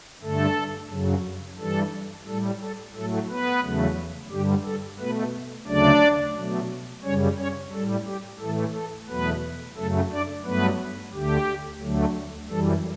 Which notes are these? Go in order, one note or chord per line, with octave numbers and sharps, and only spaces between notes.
G2 D3 A3 A4
F#2 C#3 F#3
G2 E3 G3 A4
A2 G3 A4
A4
A2 F#3 A3 A4
B3 B4
E2 C#3 F#3 A3
G2 D3 G3 G4
A4
B2 A3 B3 B4
D2 C#3 F#3 A3 D4 D5
B2 F#3 A3
F#2 C#3 G3 C#4 C#5
C#4 C#5
A2 G3 A4
G4
A2 E3 A3 A4
A4
E2 B2 F#3 A3 B3 B4
F#2 C#3 F#3 A3 A4
D4 D5
G2 F#3 A3 B3 B4
D2 D3 A3 G4
D2 D3 F#3 A3
F#2 E3 G3 A4